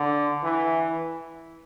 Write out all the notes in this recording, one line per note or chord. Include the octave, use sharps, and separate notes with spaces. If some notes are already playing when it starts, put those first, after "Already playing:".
Already playing: D3
E3